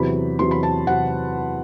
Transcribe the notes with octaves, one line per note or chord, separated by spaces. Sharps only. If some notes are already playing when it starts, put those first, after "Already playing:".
Already playing: E2 C3 F#3 B5
E2 C3 F#3 C6
B5
A5
C3 F#3 F#5